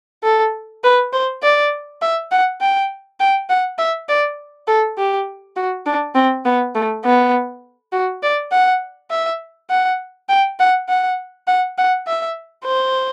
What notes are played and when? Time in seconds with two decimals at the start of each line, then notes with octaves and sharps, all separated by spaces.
0.24 A4
0.84 B4
1.13 C5
1.43 D5
2.02 E5
2.32 F#5
2.61 G5
3.20 G5
3.50 F#5
3.78 E5
4.09 D5
4.68 A4
4.98 G4
5.56 F#4
5.86 D4
6.15 C4
6.45 B3
6.75 A3
7.05 B3
7.93 F#4
8.23 D5
8.52 F#5
9.11 E5
9.70 F#5
10.29 G5
10.60 F#5
10.89 F#5
11.47 F#5
11.78 F#5
12.07 E5
12.65 C5